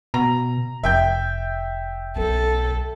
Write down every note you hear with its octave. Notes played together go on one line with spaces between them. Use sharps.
B2 A#5
F1 E5 G5 G6
B1 A4